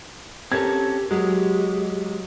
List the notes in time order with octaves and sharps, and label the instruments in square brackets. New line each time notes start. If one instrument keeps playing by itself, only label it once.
[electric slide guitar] C4 C#4 A4 [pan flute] G4 [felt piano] A#4 G#6
[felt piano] F#3 [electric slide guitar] G#3 [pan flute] G4